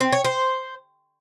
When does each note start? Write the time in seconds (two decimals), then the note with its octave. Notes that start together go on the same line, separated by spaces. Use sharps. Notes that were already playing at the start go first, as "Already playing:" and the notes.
0.01 C4
0.13 C#5
0.24 C5